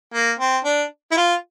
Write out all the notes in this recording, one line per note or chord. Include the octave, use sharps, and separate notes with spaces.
A#3
C4
D4
E4
F4